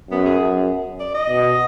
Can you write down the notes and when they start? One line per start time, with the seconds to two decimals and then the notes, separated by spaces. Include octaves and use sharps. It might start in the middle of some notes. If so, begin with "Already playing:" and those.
0.11 F#2 B3
0.26 G#4
0.41 F#2
1.00 D5
1.14 D#5
1.29 B2